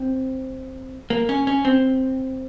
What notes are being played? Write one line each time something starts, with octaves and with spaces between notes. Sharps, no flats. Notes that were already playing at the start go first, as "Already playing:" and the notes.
Already playing: C4
A#3
C#4
C#4
C4